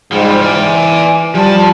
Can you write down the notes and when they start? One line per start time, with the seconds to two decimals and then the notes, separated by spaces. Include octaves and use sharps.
0.12 G#2 F3 G3
0.43 E3 D5 G#5
1.35 F3 G3 A5